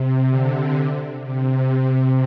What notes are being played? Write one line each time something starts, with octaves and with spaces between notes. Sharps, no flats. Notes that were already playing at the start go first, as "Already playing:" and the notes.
Already playing: C3
D3
C3